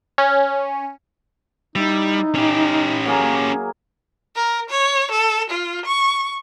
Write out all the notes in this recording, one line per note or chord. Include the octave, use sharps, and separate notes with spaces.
C#4
G3 D#4 E4
C#4 G4
F#3 A#3 G#4
A#4
C#5
A4
F4
C#6